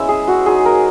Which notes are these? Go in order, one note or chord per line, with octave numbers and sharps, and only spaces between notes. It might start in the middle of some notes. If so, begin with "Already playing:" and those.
Already playing: G#3 B3 C#4 E4 C#5 E5
G#4
F#4
G#3 D#4 G#4
A#4